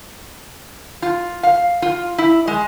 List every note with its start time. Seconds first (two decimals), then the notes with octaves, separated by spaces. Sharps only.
1.02 F4
1.43 F5
1.82 F4
2.18 E4
2.47 G#3